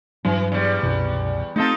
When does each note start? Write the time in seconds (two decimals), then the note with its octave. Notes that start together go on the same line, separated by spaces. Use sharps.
0.25 G2 E3 F#3 D4
0.52 E2 G3
0.83 C2 F#2 B2
1.56 A3 C4 D#4 F4 A4